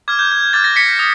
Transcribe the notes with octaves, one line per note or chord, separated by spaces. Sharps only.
D6 F6 G#6
G6
G#6
D6 F6 A6
A#6
B6 C#7
D#6